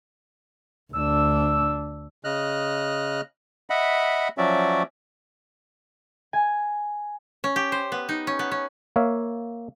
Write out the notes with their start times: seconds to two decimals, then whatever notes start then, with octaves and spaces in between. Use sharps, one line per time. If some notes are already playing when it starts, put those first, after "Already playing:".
0.93 D2 D4 E6
2.24 C#3 D#5 F6 F#6
3.70 D#5 E5 F#5 B5
4.38 F3 F#3 C#4 F#4 D5 E5
6.33 G#5
7.44 C#4
7.56 G4
7.72 C5
7.92 B3
8.09 D#4
8.27 C#4
8.39 B3
8.51 C#4
8.96 A#3 C#5 E5 F5